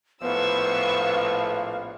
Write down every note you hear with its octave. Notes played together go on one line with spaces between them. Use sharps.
A#1 A2 F3 B3 F5 C#6 E6